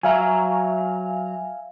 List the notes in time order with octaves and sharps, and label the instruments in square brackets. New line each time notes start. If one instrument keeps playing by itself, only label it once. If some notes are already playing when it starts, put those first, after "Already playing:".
[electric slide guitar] F#3 A#5 [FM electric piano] E5 F5 G#5